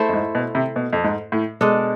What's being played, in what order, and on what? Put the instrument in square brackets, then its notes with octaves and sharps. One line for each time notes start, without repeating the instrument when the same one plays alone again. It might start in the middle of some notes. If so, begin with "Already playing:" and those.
Already playing: [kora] A3 E4 A4 C5
[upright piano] F2
G#2
B2
C3
B2
F2
G#2
A2
[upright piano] B2 [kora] G#3 D4 A4